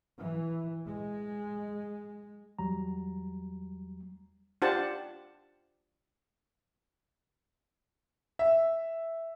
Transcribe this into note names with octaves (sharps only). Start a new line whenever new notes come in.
E3
G#3
E2 F#3 G3 A#5
D4 F4 G4 C5 F#5 A5
E5